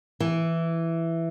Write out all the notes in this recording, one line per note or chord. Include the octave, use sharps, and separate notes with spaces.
E3